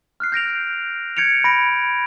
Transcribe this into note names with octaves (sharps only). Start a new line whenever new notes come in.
F6 F#6 C7
G6 A#6 D7 F7
G6 G#6 C#7 D7 F7
B5 A#6 D7